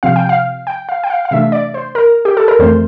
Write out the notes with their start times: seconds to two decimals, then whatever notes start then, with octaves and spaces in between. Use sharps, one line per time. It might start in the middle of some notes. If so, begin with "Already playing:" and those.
0.03 C3 F3 C4 F5
0.16 G5
0.29 F5
0.67 G5
0.89 F5
1.04 G5
1.10 F5
1.25 F5
1.31 C3 E3 A3 D4 E5
1.52 D5
1.74 C5
1.95 A#4
2.25 G4
2.37 A4
2.48 A#4
2.59 F2 E3 A3 C4 C5